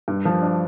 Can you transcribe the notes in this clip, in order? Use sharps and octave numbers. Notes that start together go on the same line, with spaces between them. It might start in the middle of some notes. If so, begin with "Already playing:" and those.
G2
F3
D4